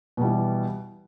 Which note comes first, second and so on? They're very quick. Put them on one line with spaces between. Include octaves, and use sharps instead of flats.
B2 G3 E3